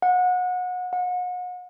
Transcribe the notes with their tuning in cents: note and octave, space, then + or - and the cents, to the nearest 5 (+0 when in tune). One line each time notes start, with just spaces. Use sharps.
F#5 -30
F#5 -40